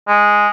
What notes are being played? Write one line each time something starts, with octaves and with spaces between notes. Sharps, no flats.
G#3